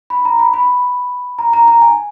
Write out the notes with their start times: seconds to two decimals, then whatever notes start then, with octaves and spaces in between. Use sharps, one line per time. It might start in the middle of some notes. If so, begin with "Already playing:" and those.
0.10 B5
0.25 A#5
0.39 B5
0.54 B5
1.39 A#5
1.53 A#5
1.68 A#5
1.82 G#5